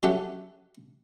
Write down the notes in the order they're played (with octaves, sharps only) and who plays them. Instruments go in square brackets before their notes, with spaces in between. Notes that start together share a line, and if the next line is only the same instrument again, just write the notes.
[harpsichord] F#3 C#4 G4 A4 E5 F#5